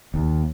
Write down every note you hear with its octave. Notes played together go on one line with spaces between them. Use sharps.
D#2